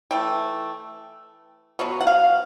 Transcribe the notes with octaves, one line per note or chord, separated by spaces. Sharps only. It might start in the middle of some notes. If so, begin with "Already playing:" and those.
E3 A3 G5
B2 F#3 B3
F#5
F5